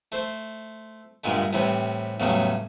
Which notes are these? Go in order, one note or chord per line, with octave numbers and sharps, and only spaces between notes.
A3 C5
G2 A#2 D3 G#3 A3
A2 C3 E3 G3
E2 A2 C#3 F#3 G3 A3